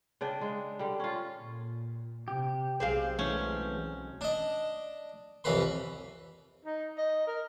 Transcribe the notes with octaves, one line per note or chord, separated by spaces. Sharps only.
C#3 D4 D5 G5
G#3
D3 G3
C#4 F4
A#2
C3 G4
B1 F#3 G#3 C4 G#4 F5
E3 A3 C#4
D4 D#5
C2 F2 E3 C#4 B4 C6
D#4
D#5
A#4